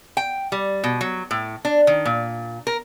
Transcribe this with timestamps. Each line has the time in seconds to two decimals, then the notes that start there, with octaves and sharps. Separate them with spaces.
0.17 G5
0.52 G3
0.84 B2
1.01 F#3
1.31 A2
1.65 D4
1.87 D#3
2.05 A#2
2.67 A#4